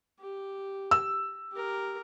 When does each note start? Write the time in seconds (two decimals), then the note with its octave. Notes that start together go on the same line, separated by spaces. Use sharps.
0.20 G4
0.91 E6
1.52 G4 A#4